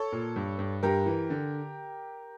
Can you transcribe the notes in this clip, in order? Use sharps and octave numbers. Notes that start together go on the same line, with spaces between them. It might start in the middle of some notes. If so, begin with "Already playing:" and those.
Already playing: A4 C#5
A#2
G2
G2
G2 G4 A#4
E3
D3